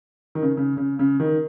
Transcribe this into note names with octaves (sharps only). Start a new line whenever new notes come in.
D#3
C#3
C#3
C#3
C#3
D#3